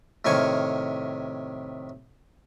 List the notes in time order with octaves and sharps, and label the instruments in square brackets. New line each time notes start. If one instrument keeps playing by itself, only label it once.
[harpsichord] A2 C3 D#3 F5 G#5 C#6